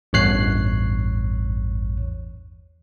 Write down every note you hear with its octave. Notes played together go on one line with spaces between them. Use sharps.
A1 E2 G2 C#5 F#6 C7